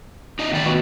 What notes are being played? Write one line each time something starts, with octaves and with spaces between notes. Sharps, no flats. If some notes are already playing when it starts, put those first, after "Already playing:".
D#4 D5 D#5
A2 D#3 D5
B3 F#4 D#5